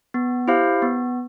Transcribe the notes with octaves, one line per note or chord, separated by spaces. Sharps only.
B3
E4 G4 C5 F5
B3